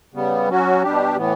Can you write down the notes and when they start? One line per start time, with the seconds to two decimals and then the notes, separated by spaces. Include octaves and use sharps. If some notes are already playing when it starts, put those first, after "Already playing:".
0.14 C#3 G3 B3
0.48 F#3 C#4 F#4
0.83 B2 G3 D4 G4
1.17 A2 E3 B3